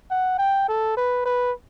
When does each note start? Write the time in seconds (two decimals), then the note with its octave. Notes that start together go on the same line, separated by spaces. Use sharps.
0.11 F#5
0.39 G5
0.69 A4
0.97 B4
1.25 B4